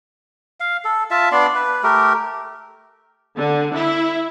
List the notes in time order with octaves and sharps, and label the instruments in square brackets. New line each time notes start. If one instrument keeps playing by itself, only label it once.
[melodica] F5
A4
F4 E5 A5
B3 D4 D5 C6
B4
A3 G4 A#4
[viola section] D3
E4